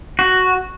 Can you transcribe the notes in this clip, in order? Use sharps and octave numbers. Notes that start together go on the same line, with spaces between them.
F#4